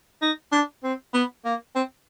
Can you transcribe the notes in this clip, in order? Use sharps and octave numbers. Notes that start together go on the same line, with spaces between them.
D#4
D4
C4
B3
A#3
C4